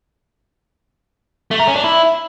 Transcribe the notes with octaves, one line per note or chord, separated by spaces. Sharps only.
A3
A#4
C#4
D4
E4